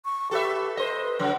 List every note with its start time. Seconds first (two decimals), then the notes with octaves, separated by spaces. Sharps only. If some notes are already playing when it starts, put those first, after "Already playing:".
0.05 C#6
0.31 G4 A4 B4 E5
0.77 B4 C5 D#5
1.19 C#3 F#3